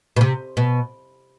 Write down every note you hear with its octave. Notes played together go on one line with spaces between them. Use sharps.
B2
C3
B2